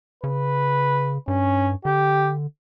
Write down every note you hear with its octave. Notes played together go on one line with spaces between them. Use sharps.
C#3 B4
G2 C#4
D3 G4